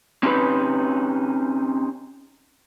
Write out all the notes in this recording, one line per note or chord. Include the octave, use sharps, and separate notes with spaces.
C4 C#4 D#4 G4 B4